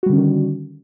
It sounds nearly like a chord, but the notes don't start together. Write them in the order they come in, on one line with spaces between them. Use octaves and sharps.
F#4 G3 D3 C#4 D#3